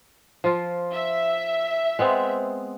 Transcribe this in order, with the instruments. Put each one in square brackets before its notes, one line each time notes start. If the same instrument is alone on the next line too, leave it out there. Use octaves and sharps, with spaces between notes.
[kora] F3 F4
[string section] E5
[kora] G#3 B3 C4